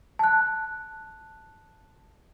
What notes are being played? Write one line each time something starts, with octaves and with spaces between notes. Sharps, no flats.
A5 F#6